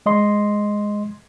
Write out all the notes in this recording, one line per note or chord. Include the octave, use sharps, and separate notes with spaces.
G#3 D#5 C6